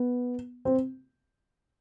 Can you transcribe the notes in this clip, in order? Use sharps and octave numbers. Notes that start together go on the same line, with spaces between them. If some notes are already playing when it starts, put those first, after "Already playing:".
Already playing: B3
C4